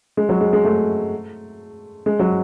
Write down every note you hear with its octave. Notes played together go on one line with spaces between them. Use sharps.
G#3
F#3
G#3
G#3
A3
G#3
F#3